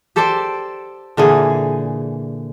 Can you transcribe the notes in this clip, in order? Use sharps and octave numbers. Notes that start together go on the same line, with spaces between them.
G4 A4 C5 D5 G5 A5
A#2 D3 E3 G#4